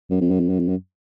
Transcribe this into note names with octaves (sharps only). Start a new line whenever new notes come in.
F#2
F2
F#2
F2
F#2
F2
F#2